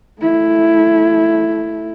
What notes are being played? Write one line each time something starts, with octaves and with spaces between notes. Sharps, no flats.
A3 E4